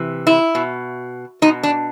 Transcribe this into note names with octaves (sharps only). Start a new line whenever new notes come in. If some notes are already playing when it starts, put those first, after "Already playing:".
Already playing: C3 E3
E4
B2
B2 D#4
D4